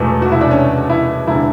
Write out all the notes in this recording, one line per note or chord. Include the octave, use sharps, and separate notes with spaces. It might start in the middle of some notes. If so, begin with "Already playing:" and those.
Already playing: E1 E2 B2 A3
F#4
E4
D4
C#4
E4
E1 D3 E4